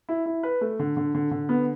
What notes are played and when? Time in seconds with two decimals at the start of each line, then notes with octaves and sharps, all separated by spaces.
0.09 E4
0.26 E4
0.43 B4
0.61 A3
0.79 D3
0.97 D3
1.15 D3
1.31 D3
1.49 B3